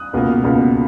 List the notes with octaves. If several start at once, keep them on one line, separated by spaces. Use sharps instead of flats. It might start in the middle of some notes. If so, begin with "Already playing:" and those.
Already playing: D#6 F#6
C#2 B2 A#3
C#2 B2 A#3